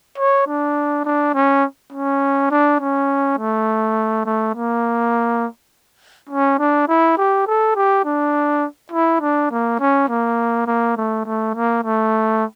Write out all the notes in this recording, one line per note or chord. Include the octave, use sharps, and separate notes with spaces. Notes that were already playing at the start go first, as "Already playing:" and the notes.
C#5
D4
D4
C#4
C#4
D4
C#4
A3
A3
A#3
C#4
D4
E4
G4
A4
G4
D4
E4
D4
A#3
C#4
A#3
A#3
A3
A3
A#3
A3